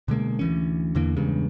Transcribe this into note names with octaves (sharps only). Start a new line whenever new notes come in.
B2 D3 G#3 A#3
D2 E3 C#4
E2 D3 E3 A#3
E2 G2 C#3 G#3